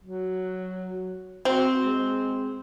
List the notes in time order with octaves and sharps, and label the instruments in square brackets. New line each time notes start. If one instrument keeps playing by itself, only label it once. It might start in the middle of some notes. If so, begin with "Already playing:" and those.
[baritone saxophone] F#3
[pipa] C4 [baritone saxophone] F#4
[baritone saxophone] G#3